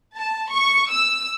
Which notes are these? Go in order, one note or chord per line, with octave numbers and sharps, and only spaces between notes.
A5
C#6
E6